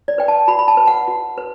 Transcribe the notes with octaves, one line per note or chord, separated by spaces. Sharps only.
D5
B4 G5
A5
F#4 B5
B5
A5
B4
F#5
F#4
B4